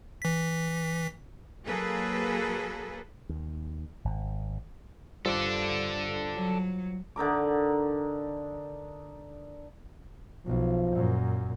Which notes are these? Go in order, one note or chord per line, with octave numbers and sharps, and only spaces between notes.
E3 B6
F#3 A#3 G#4 A4 B4
D#2
G#1
G2 G3 F4 A4 C5 D5
F#3
D3 D#4 A#4 D6
B1 F3
F#2 A#2